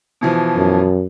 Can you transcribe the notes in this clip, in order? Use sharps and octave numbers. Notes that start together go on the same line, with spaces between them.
B2 E3 F3
F#2